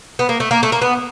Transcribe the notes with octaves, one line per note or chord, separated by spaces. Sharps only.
B3
A#3
A3
A#3
A3
A#3
B3